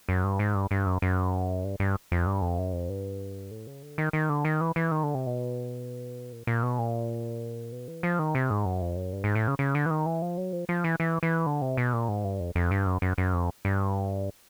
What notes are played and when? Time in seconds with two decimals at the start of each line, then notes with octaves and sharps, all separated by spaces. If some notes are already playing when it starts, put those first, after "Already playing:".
0.09 F#2
0.24 G2
0.39 G#2
0.55 G2
0.71 G2
0.86 F#2
1.02 F#2
1.64 G2
1.80 G2
2.12 F2
2.27 G2
2.42 F2
2.58 F#2
2.73 F2
2.89 G2
3.51 A2
3.67 C#3
3.83 D3
3.98 D#3
4.13 D#3
4.29 D3
4.45 D#3
4.61 E3
4.76 E3
4.91 D#3
5.03 D3
5.15 C3
5.26 B2
6.32 A#2
6.47 A#2
6.63 B2
6.79 A#2
7.72 B2
7.88 E3
8.03 F3
8.19 D#3
8.35 C3
8.50 G#2
8.65 F#2
8.81 F2
8.96 F#2
9.13 G2
9.24 G#2
9.35 A2
9.48 C#3
9.59 C#3
9.75 D3
9.86 E3
9.91 D#3
10.06 E3
10.22 F3
10.37 F#3
10.53 F3
10.69 F3
10.84 E3
11.00 E3
11.23 E3
11.46 D3
11.62 C3
11.77 B2
11.93 A#2
12.09 G#2
12.24 G2
12.40 F2
12.55 F2
12.71 G2
12.86 F#2
13.02 F#2
13.18 F#2
13.33 F2
13.65 G2